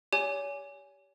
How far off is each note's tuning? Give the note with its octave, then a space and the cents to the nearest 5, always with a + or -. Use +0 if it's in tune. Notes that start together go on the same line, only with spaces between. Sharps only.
G4 +0 C#5 +40 G#5 +0